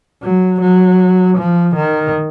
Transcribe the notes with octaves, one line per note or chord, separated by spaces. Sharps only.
F#3
F#3
F3
D#3